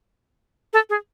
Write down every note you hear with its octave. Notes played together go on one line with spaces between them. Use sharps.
A4
G#4